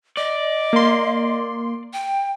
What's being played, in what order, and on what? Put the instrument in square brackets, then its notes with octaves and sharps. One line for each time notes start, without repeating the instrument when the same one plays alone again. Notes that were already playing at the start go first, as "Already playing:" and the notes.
[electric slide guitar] D5 [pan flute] D#5
[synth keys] A#3 C6
[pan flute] G5